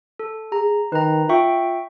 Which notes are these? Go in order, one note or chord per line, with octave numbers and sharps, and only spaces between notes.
A4
G#4 A#5
D#3 B4 A#5
F4 E5 G5 C#6